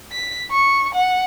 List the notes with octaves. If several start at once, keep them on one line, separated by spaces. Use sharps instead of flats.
B6
C#6
F#5